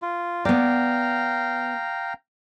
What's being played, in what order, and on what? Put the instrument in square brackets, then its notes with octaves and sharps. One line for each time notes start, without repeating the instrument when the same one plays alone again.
[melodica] F4
[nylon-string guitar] B3 D5 [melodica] F5 G5 A#5